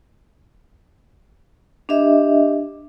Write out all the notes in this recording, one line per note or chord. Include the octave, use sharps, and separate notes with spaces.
D4 G4 D#5 E5